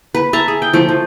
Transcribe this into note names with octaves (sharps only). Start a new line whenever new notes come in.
B4
E5 A5 A#5
G#4
G5
F3 A3 G5
F3